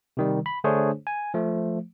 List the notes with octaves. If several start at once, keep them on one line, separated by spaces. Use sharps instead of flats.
C3 D#3 G3
B5
D3 A3 D4 G#4 C5 C#5
G#5
F3 A3